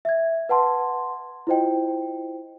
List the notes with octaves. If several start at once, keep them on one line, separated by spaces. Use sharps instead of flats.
E5 G#6
B4 F#5 A5 C6
E4 F4 C5 D#5 G5